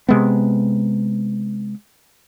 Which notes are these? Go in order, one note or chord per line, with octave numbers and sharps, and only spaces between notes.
C3 G#3 B3